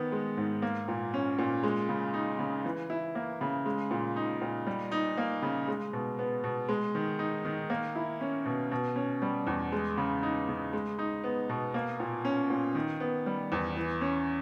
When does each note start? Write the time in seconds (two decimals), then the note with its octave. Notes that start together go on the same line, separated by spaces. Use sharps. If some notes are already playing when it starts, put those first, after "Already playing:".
Already playing: D#3 B3
0.12 G#3
0.37 G#2
0.62 A#3
0.88 A#2
1.14 C#4
1.39 A#2
1.63 G#3
1.89 C#3
2.14 D#4
2.39 C#3
2.65 E3
2.90 E4
3.15 A#3
3.41 C#3
3.66 G#3
3.91 A#2
4.16 D#4
4.42 A#2
4.67 G3
4.92 D#4
5.17 A#3
5.42 C#3
5.68 G#3
5.93 B2
6.19 B3
6.44 B2
6.69 G#3
6.95 D#3
7.19 D#4
7.45 D#3
7.70 A#3
7.95 E4
8.21 C#4
8.46 B2
8.72 B2
8.96 C#4
9.22 G3
9.47 E2
9.72 G#3
9.98 C#3
10.23 D#4
10.49 C#3
10.73 G#3
10.99 D#4
11.24 B3
11.49 B2
11.74 A#3
12.00 A#2
12.25 C#4
12.50 A#2
12.75 D#3
13.00 B3
13.26 G3
13.52 E2
13.76 E3
14.01 C#4